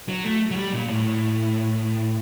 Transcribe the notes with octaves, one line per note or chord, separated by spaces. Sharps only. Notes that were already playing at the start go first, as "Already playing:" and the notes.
F#3
A3
F#3
G3
A#2
A2